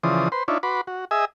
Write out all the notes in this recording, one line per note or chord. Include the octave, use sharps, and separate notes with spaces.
C#3 E3 F3 C5 D5 D#6
B4 C5 C6
D4 D#4 F4 C#5 D5 E5
F#4 B4 B5 C6 D6
F#4
G#4 D#5 E5 G#5 D#6 E6